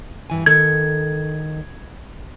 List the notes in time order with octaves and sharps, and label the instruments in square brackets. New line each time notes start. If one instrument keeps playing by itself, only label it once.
[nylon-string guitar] G2 E3 G#5
[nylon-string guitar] D#3 A4 [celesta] G#6